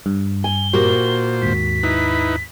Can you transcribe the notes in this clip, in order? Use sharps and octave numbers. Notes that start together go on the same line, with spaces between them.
G2
G#5 G7
A#2 F#4 G4 A#4 C5
D#2 G#2 B6
D#4 E4 B4